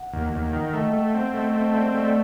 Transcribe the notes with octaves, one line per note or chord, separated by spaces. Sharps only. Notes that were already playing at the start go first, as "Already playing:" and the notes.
Already playing: F#5
D#2
D#2
D#3 G5
A3 D#5
G5
A3
G5
C4 F#5
A3 D#5
C4 A5
C4 D5
A3
D5